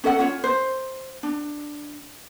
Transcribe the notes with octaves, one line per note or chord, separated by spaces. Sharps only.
C#4 A4 D#5 F#5
C#4 F4 C#5
C5
D4